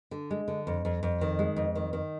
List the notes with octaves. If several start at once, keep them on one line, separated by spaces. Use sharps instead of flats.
D3
G#3
D3
F2
F2
F2
D#3
G#3
F2
D#3
D#3